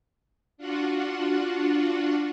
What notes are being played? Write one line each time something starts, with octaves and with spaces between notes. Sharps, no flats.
D4 F4 F#4 F#5